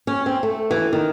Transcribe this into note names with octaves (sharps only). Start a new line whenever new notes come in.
C#4
C4
A3
E3
D#3